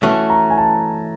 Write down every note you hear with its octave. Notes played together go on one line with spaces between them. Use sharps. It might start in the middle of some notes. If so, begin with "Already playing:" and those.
E3 A3 C#4 F#4 A5
A#5
G#5
A5